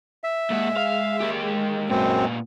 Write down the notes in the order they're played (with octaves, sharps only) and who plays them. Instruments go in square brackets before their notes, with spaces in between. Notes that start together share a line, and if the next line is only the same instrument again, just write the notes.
[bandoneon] E5
[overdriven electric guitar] A#2 F#5 [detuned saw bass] G#3
[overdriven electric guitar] F5
A#3 G4
[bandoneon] F#2 C4 [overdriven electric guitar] A#2 B3